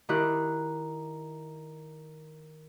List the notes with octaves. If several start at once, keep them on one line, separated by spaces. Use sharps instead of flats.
D#3 E4 G4 F#6